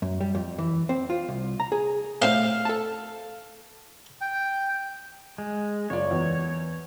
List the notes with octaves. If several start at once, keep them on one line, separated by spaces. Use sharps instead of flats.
F#2
G3
F2
E3
C4
F4
C2
A#5
G#4
A2 C4 F5 G5
A4 A5
G5
G#3
F#1 F4 C#5 D5
E2